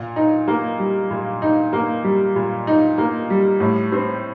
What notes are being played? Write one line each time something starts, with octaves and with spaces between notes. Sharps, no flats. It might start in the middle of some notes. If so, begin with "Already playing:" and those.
Already playing: A#2
D#4
A#3
G3
A#2
D#4
A#3
G3
A#2
D#4
A#3
G3
A2
C4